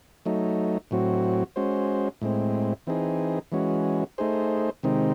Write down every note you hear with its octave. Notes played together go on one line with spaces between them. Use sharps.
F#3 A3 D#4
A2 F#3 C4 F#4
G#3 C#4 F#4 C5
A2 G#3 C4
E3 C4 D#4 G#4
E3 G#3 C#4 F#4
A3 D#4 G#4 C5
C3 D#3 G#3 C4 D#4